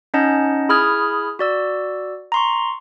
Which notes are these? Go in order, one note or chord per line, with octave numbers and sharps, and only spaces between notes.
C#4 D#4 D#5 F#5 A5 G6
E4 G#4 B5 D#6 F6 G#6
F#4 D5 E6
A#5 C6 C#6